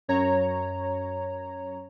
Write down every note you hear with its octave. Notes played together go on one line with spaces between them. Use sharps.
F#2 C#5 A#5